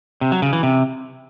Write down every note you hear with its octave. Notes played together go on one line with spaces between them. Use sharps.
C3
F#3
C#3
E3
C3